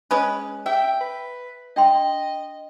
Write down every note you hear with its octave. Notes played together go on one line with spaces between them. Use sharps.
G#3 C#4 B4
E5 G5
B4
D4 D#5 G5 C6